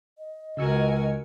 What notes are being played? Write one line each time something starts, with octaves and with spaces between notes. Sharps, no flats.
D#5
C#2 C#3 F#4 A#4 G#5 E6 C#7